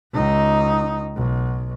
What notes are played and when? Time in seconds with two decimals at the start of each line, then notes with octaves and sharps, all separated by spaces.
0.13 C#2 D#4
1.16 B1